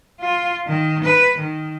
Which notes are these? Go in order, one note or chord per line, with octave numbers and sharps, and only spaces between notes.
F4
D#3
B4
D#3